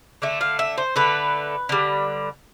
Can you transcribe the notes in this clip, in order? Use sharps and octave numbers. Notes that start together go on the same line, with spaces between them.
D3 A3 E5
F5
E5
C5
D3 A3 B4
D3 G3